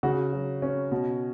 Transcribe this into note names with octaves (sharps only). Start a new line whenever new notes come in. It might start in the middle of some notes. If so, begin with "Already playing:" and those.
C#3 F#4
F#3
C#4
B2